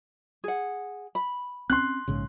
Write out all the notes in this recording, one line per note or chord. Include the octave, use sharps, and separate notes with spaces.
G#4 F#5
B5
C4 C#4 C6 F#6
A#1 G#2 C#3